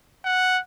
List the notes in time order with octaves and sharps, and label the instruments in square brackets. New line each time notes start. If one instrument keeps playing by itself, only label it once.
[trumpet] F#5